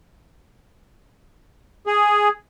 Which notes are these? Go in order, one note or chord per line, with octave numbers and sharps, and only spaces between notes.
G#4